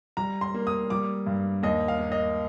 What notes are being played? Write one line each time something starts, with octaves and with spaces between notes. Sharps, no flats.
G3 A#5
C6
A#3
D#6
G3 D6
G2
D#2 D#5
F5
A#3
D#5